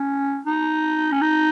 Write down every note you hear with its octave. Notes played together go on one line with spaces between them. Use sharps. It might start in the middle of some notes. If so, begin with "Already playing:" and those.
Already playing: C#4
D#4
C#4
D#4